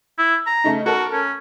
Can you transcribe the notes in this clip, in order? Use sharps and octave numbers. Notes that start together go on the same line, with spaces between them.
E4
A#5
C#3 A3 D#4
F#4 A4 A#4
C#4